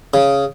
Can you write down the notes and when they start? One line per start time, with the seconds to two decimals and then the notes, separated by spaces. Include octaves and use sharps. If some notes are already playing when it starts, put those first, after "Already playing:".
0.14 C#3